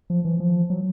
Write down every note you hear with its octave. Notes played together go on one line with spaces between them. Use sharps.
F3
E3
F3
F#3